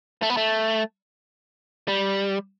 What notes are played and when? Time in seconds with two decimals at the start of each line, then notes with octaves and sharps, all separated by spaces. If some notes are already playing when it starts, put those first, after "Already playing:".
0.22 A3
0.30 B3
0.37 A3
1.88 G3